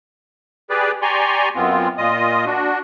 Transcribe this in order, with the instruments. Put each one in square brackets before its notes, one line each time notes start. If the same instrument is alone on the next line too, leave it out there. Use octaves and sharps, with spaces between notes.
[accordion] G4 G#4 B4 D5
G4 D5 G#5 A#5 C6 C#6
F#2 B3 C4 F4
A#2 F4 D#5 D#6
D4 F#4